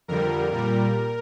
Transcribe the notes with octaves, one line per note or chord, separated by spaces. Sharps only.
F2 D3 G3 A#4
A#2 G3 A#4